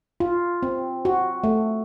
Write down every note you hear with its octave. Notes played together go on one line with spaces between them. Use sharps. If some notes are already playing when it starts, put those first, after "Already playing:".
F4
C4
F#4
A3